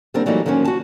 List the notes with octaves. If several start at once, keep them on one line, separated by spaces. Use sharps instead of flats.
D3 G3 A#3 C4 D4 A#4
E3 F#3 G3 A3 A#3 D#4
D#3 F3 F#3 A#3 C#4
F#4 A5